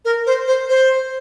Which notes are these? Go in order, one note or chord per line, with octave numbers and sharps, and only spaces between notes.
A#4
C5
C5
C5